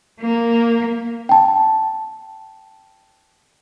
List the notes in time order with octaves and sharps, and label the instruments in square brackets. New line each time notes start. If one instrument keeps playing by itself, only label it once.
[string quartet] A#3
[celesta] G5 A5